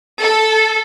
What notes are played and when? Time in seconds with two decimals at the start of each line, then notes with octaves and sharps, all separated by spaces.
0.22 A4